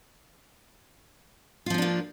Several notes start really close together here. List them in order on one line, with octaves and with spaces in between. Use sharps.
F4 F3 C#4 D4 A#3